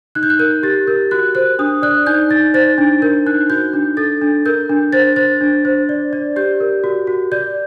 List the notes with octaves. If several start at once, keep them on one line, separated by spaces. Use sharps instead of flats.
D#4 F#6
G6
F#6
A#4 G6
G4 A6
A#4 G6
F#4 F#6
C5 F#6
D4 D#6
D5 F#6
D#4 G6
D#4 A6
C5 A6
D4
A#4 G6
D#4 F#6
F#4 G6
D4
A4 A6
D4
A#4 G6
D4
C5 A6
C5 A6
D4
C5
D5
D5
G4 G6
A#4
F#4
F#4
D5 G6